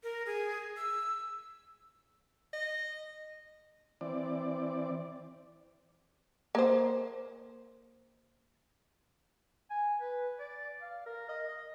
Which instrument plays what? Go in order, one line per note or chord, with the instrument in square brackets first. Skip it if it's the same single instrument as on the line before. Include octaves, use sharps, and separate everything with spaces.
[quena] A#4
G#4
E6
[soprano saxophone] D#5
[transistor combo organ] E3 C4 D5
[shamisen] A#3 C5
[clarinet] G#5
B4
D5
F5
A#4
D#5
D#5